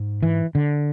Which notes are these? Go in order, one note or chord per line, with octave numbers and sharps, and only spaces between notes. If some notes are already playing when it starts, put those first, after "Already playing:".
Already playing: G#2
E3
D3